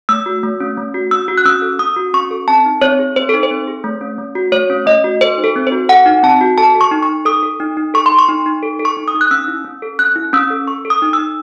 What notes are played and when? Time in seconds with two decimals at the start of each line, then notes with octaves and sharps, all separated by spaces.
0.09 A3 E6
0.26 F#4
0.43 A3
0.60 C#4
0.77 A3
0.94 F#4
1.11 C#4 E6
1.28 F#4
1.38 F#6
1.45 C#4 E6
1.62 A4
1.79 C#4 D#6
1.96 F#4
2.14 C#4 C#6
2.31 A4
2.48 C4 A5
2.65 D#4
2.81 C4 C#5
2.99 G#4
3.16 C4 C5
3.29 D#4 A4
3.43 C5
3.51 C4
3.68 G#4
3.84 A3
4.01 C#4
4.18 A3
4.35 F#4
4.52 A3 C#5
4.70 C#4
4.86 A3 D#5
5.04 F#4
5.21 A4 C5
5.38 D#4
5.44 A4
5.56 C4
5.67 C5
5.72 F#4
5.89 A4 F#5
6.06 D#4
6.23 C4 A5
6.41 F#4
6.58 A4 A5
6.75 A4
6.81 C#6
6.91 D#4
7.03 C#6
7.09 D#4
7.25 A4 D#6
7.43 A4
7.60 D#4
7.77 D#4
7.94 A4 C#6
8.06 C6
8.11 A4
8.19 C#6
8.28 D#4
8.46 D#4
8.63 A4
8.79 A4
8.85 C#6
8.97 D#4
9.08 D#6
9.14 D#4
9.21 F#6
9.31 C#4 E6
9.48 E4
9.65 C#4
9.82 A4
9.99 C#4 F#6
10.16 E4
10.33 C#4 E6
10.50 A4
10.67 A4 C#6
10.85 A4
10.90 D#6
11.02 D#4
11.13 E6
11.18 D#4